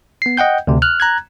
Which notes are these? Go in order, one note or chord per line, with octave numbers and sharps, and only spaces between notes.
B3 C7
D#5 F#5 G5 G6
D2 C3
F6 F#6
A#5 F#6 G#6